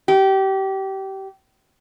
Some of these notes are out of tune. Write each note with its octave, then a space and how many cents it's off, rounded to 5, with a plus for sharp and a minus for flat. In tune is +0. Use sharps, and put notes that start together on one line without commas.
G4 -25